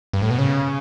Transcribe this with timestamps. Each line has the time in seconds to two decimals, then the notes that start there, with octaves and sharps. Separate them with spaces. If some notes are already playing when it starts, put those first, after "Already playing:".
0.13 G2
0.22 A2
0.30 B2
0.38 C#3